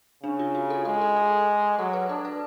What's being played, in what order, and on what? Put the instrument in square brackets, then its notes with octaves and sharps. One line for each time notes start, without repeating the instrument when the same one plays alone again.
[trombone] C#3 [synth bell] D4
[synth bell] F4
F#4
A4
[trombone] G#3 [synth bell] A4
[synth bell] A4
G#4
[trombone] F#3 [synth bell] A4
[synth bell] B4
[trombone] D4 [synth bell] A4
[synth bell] B4